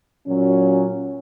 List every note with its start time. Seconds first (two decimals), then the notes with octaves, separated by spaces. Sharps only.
0.28 A#2 F#3 C#4